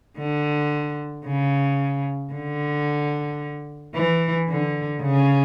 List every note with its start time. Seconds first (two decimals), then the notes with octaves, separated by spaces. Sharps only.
0.18 D3
1.26 C#3
2.33 D3
3.95 E3
4.49 D3
5.02 C#3